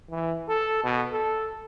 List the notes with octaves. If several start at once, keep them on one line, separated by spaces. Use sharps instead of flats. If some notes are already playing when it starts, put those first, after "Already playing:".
E3
A4
B2
A4